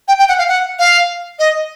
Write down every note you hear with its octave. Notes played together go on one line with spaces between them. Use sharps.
G5
G5
F#5
F5
F#5
F5
D#5